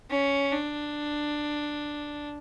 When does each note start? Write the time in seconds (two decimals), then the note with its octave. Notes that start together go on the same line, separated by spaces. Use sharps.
0.11 C#4
0.52 D4